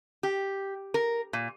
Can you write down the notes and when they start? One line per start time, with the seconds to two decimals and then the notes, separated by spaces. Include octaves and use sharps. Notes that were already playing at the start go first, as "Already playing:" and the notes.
0.23 G4
0.94 A#4
1.33 A#2